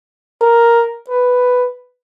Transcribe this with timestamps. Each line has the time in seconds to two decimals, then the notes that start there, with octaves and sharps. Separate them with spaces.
0.42 A#4
1.10 B4